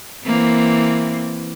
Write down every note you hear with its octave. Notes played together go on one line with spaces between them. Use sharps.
E3 A#3 C4